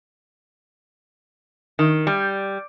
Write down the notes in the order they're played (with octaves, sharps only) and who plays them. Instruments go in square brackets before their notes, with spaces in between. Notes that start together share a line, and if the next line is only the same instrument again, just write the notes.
[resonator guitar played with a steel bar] D#3
G3